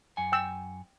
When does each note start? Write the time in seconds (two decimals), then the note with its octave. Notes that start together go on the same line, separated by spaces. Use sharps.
0.17 F#2 F#5 G#5
0.32 G5 E6